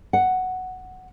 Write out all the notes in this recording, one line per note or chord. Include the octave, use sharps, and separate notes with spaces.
F#5